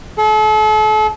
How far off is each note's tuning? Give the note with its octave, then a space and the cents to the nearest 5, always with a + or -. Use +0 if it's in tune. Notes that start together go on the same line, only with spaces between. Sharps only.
A4 -40